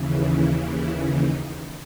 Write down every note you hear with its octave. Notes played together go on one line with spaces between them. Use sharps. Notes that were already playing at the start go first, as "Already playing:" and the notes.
Already playing: D#2 C#3 E3
E4
E4
D#4